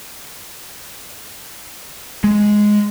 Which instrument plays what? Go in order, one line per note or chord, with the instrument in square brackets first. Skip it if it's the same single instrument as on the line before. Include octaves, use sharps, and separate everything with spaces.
[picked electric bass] G#3